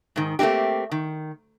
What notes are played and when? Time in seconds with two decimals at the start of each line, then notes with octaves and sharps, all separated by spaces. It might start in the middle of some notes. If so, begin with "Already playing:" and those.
0.16 G#2 D#3
0.39 A3 A#3 C4 D#4 G4
0.92 D#3